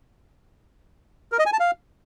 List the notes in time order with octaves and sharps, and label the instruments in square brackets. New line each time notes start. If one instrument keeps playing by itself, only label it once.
[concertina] A#4
D#5
G#5
A5
F5